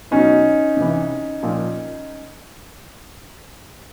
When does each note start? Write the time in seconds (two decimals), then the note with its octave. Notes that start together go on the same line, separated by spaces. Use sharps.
0.11 B2 F#3 C#4 D#4
0.77 C3 E3
1.43 A#2 F3